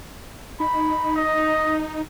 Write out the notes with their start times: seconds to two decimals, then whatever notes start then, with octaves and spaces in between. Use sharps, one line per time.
0.60 D#4 B5
1.15 D#5